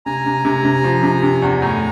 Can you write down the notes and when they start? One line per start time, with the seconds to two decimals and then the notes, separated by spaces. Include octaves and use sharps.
0.06 C3 G#5 A#5
0.26 C3
0.45 C3
0.64 C3
0.84 F3
1.03 C3
1.23 C3
1.42 E2
1.61 A2 G#5 A#5